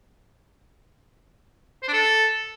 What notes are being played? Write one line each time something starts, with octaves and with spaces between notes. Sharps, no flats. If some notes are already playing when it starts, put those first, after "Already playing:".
C5
D4
A4